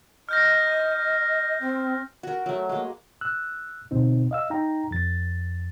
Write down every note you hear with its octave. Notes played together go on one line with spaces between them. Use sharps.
D#5 F6 G6 A#6
C4
F#4 A#4
F#3 A3
G#3 A#3
E6 F#6
D2 B2 C4 D#4
D#5 F5 E6
D#4 G5 A#5
F2 A6